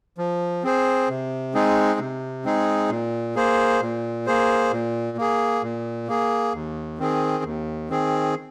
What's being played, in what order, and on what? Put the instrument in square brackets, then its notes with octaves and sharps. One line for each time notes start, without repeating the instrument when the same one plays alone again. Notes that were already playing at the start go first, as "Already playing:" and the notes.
[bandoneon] F3
C4 G#4 C5
C3
G#3 C4 D#4 G#4
C3
G#3 C4 D#4 G#4
A#2
A#3 G#4 C5
A#2
A#3 G#4 C5
A#2
A#3 G#4
A#2
A#3 G#4
D#2
D#3 C4 G#4
D#2
D#3 C4 G#4